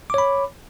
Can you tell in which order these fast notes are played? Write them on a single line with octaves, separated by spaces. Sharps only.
D6 C#5 B5